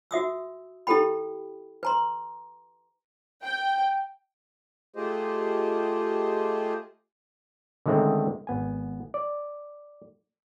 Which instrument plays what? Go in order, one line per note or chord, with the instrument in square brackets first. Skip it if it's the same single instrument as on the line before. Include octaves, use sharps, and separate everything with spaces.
[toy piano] F#4 E5 D#6 E6
E4 G4 A4 A#4 G5 B5
B4 A#5 C6
[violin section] G5
[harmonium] A3 F4 G4 G#4 C5 D#5
[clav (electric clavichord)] D3 D#3 G#3 A3 C4 C#4
G#1 B3 G#5
D5